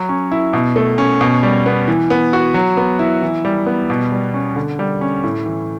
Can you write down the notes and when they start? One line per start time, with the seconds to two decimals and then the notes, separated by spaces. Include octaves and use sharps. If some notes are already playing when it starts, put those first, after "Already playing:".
Already playing: F#3
0.09 C#4
0.31 E4
0.53 B2
0.76 A3
0.98 C#4
1.21 B2
1.43 G3
1.66 B3
1.88 E3
2.10 B3
2.33 F#4
2.54 F#3
2.77 B3
2.99 E4
3.22 E3
3.45 G3
3.66 B3
3.90 B2
4.12 G3
4.34 C#4
4.56 D3
4.79 G3
5.01 C#4
5.23 A2
5.46 E3